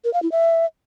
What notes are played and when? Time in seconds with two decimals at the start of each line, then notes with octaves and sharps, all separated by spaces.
0.04 A#4
0.14 F5
0.23 E4
0.32 E5